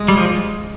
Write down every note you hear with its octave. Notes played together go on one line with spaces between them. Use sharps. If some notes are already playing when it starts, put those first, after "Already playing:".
Already playing: G#3
G3
F3